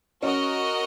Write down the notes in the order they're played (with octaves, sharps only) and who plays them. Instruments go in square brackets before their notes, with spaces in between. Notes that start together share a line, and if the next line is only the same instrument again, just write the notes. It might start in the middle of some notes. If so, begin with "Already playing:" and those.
[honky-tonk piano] C#4 [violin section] F#4 A#4 D#5